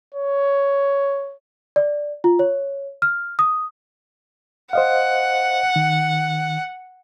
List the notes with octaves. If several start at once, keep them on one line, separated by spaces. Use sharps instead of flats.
C#5
D5
F4
C#5
F6
D#6
C5 D#5 F5 F#5
D#3